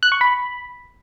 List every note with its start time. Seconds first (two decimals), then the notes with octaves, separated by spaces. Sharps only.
0.03 F#6
0.12 C#6
0.21 B5